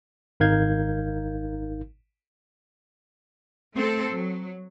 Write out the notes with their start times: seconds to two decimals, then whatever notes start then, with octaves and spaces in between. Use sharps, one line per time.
0.40 G#1 D#4 A#4 F5 G6 G#6
3.74 A3 C4 A4
4.10 F#3